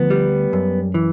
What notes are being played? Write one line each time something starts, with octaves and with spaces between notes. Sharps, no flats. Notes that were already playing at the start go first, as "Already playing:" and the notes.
Already playing: D2 F3 B3
G3
F#2
E3